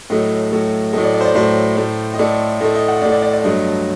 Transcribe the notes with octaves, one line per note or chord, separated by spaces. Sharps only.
A2 F#3 A3 D#5
A2 F#3 A3
A2 F#3 A3 D#5
D5
D5
C5
D5
A2 F#3 A3 C5
A2 A3
D#5
A2 A3 D5
A2 A3 D#5
D#5
F#5
A2 A3 D5
D5
D5
D5
G2 F#3 A3 D#5